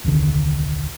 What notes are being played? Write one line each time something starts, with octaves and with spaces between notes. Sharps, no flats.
D#1 C2 D3 D#3